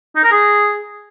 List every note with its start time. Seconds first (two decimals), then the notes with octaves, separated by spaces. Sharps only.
0.16 D#4
0.24 A#4
0.32 G#4